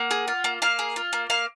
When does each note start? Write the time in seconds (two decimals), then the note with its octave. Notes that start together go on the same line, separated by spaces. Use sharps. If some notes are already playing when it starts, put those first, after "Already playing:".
Already playing: A#3 F#5
0.11 G#4
0.28 F4
0.44 A#3
0.62 A#3 F5
0.79 G#4
0.96 F4
1.13 A#3
1.30 A#3 F5